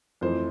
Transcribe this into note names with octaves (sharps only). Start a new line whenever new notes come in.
F2 E3 A3 C5